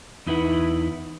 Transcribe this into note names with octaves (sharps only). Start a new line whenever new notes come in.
E2 D#4 E4 B4 F#5